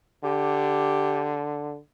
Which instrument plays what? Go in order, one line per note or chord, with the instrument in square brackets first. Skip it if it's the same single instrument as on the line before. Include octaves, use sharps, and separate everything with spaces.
[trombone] D3 [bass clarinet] G4